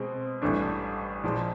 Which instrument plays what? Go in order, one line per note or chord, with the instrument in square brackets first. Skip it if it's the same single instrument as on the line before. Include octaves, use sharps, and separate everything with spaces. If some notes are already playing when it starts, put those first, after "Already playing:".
Already playing: [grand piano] B2 G#3 C4
A1 G2 E3 A3 D4
A#2 F3 G#3